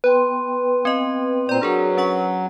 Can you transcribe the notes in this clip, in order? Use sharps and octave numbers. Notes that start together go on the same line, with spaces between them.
B3 B4 G5 C6
C4 D#5
A#2 C4 D5 A#5
F#3 D4 G#4 A#4
C#4 F#5 C#6